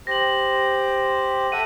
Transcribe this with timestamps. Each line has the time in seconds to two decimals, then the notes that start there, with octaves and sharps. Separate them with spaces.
0.07 G4 C5 A#6 F#7
1.52 A4 E5 F#5 D#7